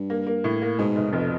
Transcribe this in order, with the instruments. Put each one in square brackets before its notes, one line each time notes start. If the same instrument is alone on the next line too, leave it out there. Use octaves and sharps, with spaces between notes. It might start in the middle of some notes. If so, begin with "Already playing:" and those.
Already playing: [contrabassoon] G2
[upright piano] A#3
A#3
A2
A#3
[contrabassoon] G#2 [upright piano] B2
[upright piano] F1
[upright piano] F1 [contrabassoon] F2